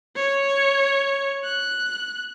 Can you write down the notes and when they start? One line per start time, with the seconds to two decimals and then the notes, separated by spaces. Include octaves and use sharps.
0.16 C#5
1.44 F#6